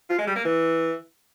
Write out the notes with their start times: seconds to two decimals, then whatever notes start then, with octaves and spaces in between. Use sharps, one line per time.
0.10 F4
0.18 G#3
0.27 G3
0.36 A#3
0.44 E3